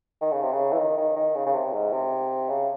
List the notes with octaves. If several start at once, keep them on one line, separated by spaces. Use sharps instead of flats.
D#3
C#3
C3
C#3
E3
D#3
D#3
D#3
C#3
C#3
C3
G#2
C3
C#3